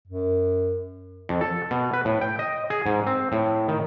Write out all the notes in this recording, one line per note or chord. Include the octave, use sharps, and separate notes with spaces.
F#2
F2
A4
B2
B4
A2
G5
D#5
G#4
G#2
C4
A2
D#3